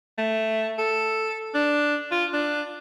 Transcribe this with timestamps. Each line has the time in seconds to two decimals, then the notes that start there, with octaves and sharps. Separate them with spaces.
0.18 A3
0.79 A4
1.55 D4
2.12 F4
2.33 D4